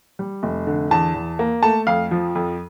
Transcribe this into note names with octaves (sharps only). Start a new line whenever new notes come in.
G3
F1
D3
E2 A5
E2
A#3
A3 A5
F2 F5
F3
F2